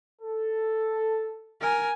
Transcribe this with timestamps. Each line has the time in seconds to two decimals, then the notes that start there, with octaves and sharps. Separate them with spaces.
0.22 A4
1.60 A#4 G#5